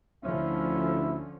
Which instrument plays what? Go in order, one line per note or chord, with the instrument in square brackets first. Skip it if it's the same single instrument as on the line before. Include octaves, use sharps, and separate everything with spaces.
[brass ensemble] D2 E4 E5 [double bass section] D3 F3 C#4